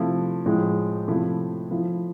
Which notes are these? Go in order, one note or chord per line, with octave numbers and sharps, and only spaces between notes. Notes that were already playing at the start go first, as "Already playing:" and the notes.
Already playing: C3 F3 A3 E4
A2 F3 G#3
C3 F3 A3 E4
F3 A3 E4